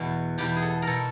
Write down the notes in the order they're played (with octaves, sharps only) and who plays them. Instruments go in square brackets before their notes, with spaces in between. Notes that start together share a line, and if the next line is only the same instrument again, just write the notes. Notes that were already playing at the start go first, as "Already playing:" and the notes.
Already playing: [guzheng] E2 B2 F#4
E2 B2 G4
G#4
A4
A#4
B2 A4